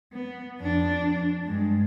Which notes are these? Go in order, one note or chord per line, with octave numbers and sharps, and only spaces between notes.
B3
F2 D4
G2 G#3